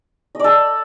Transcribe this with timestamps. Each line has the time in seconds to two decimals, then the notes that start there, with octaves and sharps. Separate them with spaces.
0.35 D#5
0.39 D5
0.44 A4